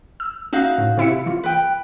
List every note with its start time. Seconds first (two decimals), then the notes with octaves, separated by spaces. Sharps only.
0.20 E6
0.53 C#4 D#4 F#4 E5 F5
0.78 A2
0.97 C3 E4 C#7
1.26 E3 F4
1.43 B4 G5